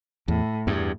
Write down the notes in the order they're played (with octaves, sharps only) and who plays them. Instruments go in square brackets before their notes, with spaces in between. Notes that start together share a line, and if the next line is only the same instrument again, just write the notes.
[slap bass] E2 [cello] A2
[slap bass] E2 G2